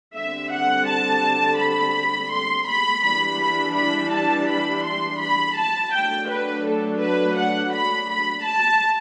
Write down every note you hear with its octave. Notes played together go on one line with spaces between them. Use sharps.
D3 G3 C4 E5
F#5
A5
B5
C6
B5
E3 G3 D4 B5
B5
B5
A5
B5
C6
B5
A5
F#3 A3 D4 G5
B4
A4
B4
F#5
B5
B5
A5